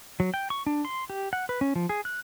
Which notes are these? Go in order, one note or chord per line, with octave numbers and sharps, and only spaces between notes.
F#3
G5
C#6
D4
C6
G4
F#5
B4
C#4
F3
G#4
F#6